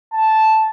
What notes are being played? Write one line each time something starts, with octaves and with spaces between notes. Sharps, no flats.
A5